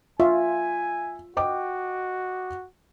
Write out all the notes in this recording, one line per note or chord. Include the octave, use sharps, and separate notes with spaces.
F4 E5 G#5
F#4 D#5 G5 D6